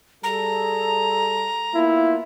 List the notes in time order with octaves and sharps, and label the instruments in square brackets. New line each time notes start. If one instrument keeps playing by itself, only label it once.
[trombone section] G3 G#4 A4 [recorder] A#5
[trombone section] A#3 B3 F4 [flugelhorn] E4